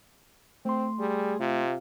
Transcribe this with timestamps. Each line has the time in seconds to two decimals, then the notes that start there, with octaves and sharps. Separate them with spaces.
0.65 A3 C4 C6
1.00 G3 G#4
1.40 C3 F4